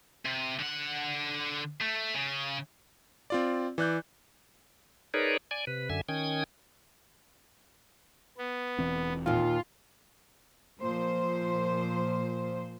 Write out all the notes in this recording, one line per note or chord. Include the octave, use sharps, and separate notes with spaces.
C3
D3 F#5
A3
C#3
C4 F4 D5
E3 D5 F#6 G6
D#4 G#4 A#4 B4 C#5 D5
D5 G#5
C3 B4
F#2 D3 E5 G#5
D#3 C#4 G5 D#6 G#6
B3
E1 E3 C4
D#2 A#2 F4
A#2 F3 C5